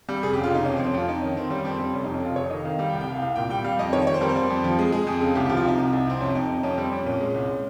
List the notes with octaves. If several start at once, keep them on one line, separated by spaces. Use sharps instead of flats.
G3
F1 G#4
G4
C#3
F4
F1 D#4
F2 C#4
C4
F2
C#4
F2 F4
F2 D#4
D#3 C#4
D#3 C4
G3 C#4
F2 C4
G3 C4
F1 C#4
D#4
F2
C#4
F1 F4
F1 C#5
D#3 D#5
D#3 F5
G3 F5
G5
C2
G5
C2 F5
C2 F5
A#2 G5
G3 G5
G3 F5
F2 D#5
D#3 C#5
F2 C#5
C5
G3 A#4
C5
G3
F2
F3
G#3
G#3 G#4
F2 G#4
C#3 G#4
C2 G4
G4
F3
F4
C3 D#4
C2
C2
C3 C4
F2 C#4
F2 D#4
C3 D#4
F2 C#4
G3 C4
F2 C#4
A#2 C#4
G#3
C2